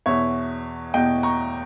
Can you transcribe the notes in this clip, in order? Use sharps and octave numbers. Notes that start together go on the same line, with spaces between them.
E2 B2 C#5 E5
E2 B2 D#5 G5
A#5 C#6